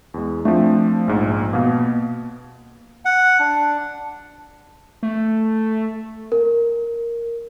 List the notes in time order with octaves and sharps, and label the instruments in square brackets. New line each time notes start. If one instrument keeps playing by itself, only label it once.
[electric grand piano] E2 G#3
[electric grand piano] F3 C4 D4 [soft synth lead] A3
[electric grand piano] A#1 G#2
[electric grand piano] B2 B3 [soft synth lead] A#3
[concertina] F#5
D4
[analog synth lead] A3
[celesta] A#4